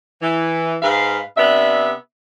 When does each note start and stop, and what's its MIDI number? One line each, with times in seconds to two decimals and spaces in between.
0.22 0.76 52
0.82 1.20 44
0.82 1.20 71
0.82 1.20 77
1.37 1.92 48
1.37 1.92 59
1.37 1.92 62
1.37 1.92 76